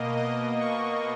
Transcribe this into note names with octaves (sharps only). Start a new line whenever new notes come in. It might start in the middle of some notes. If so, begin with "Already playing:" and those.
Already playing: B2 A#3 D#5
D#5
C#6